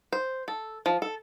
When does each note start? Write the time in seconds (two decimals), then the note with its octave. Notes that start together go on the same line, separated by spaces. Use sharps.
0.12 C5
0.48 A4
0.86 F3
1.02 A4